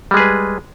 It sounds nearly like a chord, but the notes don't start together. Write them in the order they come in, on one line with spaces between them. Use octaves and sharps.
G3 G#3 G#4 B4